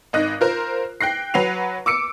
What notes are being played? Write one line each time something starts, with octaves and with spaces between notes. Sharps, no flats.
G#1 D#4 F#6 A#6
F4 A#4 C5
G5 F#6 A#6 C7
F#3 B4 F#5 C7 F7
D6 E6 C#7 D7